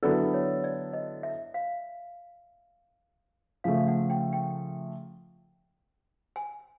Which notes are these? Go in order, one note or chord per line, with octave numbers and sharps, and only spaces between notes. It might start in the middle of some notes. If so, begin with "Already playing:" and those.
D3 F#3 B3 E4 A4 D5
C#5
D5
D#5
E5
F5
C#3 F3 A3 F5
F#5
G5
G5
G#5